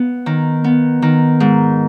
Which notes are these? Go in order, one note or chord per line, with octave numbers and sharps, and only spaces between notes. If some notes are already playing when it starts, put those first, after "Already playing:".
Already playing: B3
D#3
B3
D#3
G#2